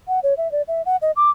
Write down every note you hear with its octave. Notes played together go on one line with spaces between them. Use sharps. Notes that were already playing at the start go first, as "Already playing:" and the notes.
F#5
C#5
E5
D5
E5
F#5
D#5
D6